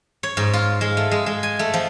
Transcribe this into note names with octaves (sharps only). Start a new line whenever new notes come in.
C#5
G#2
F4
G#3
A3
G#3
G#3
G#5
A3
F3